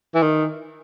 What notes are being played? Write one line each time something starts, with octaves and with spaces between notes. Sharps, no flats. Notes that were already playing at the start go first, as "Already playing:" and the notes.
E3
D#3